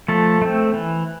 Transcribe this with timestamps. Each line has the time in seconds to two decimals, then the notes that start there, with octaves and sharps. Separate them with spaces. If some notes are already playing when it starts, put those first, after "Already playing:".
0.08 F3 A3 A4
0.42 A3 C4
0.74 E3